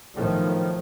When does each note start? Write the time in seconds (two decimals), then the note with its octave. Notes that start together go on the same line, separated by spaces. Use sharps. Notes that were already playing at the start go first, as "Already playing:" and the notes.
0.14 B1 A2 D#3 F3